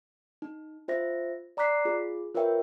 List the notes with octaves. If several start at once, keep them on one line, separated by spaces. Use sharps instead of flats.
D#4
F4 C5 E5 A#6
D5 A#5 D6 F#6 B6 C7
F4 G#4
F4 A#4 B4 C#5 E5 G5